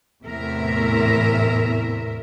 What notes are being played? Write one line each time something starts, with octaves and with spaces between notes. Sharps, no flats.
E2 A2 C3 A#4 E5